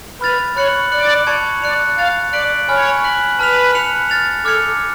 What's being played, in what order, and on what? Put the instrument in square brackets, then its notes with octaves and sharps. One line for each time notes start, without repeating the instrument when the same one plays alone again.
[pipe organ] B4 [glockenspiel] B5 F6 A6 F7
[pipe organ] C#5 [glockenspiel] B5 F#6 C#7 F#7
[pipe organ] D5 [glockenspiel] F#6 C#7 F#7
[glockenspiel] A5 C#6 G#6 C#7 F7
[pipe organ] D5 [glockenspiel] F#6 C#7 F7
[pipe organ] F5 [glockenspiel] F#6 A6 F7
[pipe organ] D5 [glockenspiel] F#6 B6 D7 F#7
[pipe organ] C#5 [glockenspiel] G#5 B5 F6
[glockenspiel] F#6 B6 F#7
[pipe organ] B4 [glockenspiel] A5 F6 B6 F7
[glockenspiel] F#6 C#7 F7
F6 A6 F7
[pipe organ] A4 [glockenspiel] D6 F6 G#6 C#7 F7